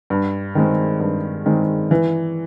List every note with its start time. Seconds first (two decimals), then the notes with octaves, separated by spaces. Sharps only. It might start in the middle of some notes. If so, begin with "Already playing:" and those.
0.10 G2
0.55 D#3 G#3 C4
1.00 G2
1.46 D#3 G#3 C4
1.91 E3